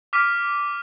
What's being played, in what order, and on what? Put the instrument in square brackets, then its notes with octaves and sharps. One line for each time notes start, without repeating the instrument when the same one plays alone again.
[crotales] D6 F6 B6 D#7